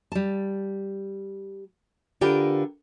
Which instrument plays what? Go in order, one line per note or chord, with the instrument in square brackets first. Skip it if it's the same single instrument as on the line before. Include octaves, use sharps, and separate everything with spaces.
[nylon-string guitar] G3 A5
D3 F4 G4 A#4 B4